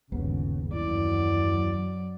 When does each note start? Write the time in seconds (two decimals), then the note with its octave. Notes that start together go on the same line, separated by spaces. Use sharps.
0.12 G1 D#2 C#3 B3
0.73 F#2 E3 F#3 D5